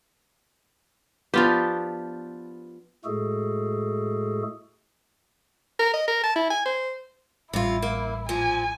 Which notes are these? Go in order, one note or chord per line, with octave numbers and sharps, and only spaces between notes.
F3 B3 D4 F4 G4
A2 G#3 A3 F#4 G#4 A4
A#4
D#5
A#4
A5
E4
G#5
C5
A1 C3 G3 E4 F4
A#3
A#2 F3 G#5